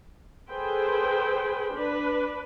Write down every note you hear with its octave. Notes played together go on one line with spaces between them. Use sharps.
G#4 A4 B4 C5 G5
D4 B4